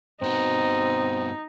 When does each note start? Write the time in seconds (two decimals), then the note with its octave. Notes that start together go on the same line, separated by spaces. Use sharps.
0.22 G2 B3 C4 D#4 F#4